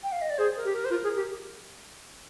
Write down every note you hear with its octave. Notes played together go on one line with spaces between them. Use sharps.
G5
F5
D#5
D5
G#4 C5
A#4
G4
A#4
C5
F4 A#4
G#4
G4